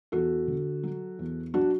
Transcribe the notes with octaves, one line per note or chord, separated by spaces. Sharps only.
E2 F#4 A4
D3
F#3
E2
F#3 D4 F#4